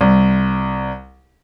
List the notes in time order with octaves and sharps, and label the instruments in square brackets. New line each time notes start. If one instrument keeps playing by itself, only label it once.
[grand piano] C2